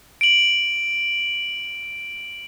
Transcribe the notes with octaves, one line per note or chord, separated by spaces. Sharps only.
D7 F#7